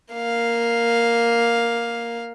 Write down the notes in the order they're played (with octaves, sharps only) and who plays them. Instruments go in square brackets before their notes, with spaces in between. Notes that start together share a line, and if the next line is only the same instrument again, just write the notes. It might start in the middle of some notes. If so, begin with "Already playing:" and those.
[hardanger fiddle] A#3 F5